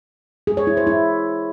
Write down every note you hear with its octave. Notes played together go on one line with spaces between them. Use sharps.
G#4
C#5
E4
C5
E4